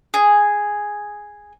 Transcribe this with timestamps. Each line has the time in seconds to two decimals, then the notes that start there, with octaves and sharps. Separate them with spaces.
0.14 G#4